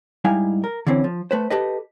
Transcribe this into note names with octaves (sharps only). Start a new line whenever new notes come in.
G#2 G3 D#4 E4 F5 G#5
A#4
D3 E3 C4 C#4
F3
A3 B4 C5
G4 A4 B4 D#5